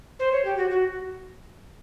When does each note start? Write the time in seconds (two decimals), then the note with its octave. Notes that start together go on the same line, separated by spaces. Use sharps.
0.19 C5
0.32 C#5
0.45 G4
0.57 F#4
0.70 F#4